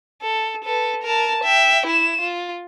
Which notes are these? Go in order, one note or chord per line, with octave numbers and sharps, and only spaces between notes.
A4
A4 B4
A#4 A5
E5 G5
E4 E7
F4